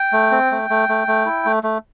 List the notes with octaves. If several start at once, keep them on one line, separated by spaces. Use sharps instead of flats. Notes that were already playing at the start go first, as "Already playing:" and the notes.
Already playing: G5
A3
C4
A3
A3
A3
A3
E4
A3
A3